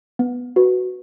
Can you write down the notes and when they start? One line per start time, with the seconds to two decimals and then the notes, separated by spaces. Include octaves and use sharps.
0.19 B3
0.56 F#4 B4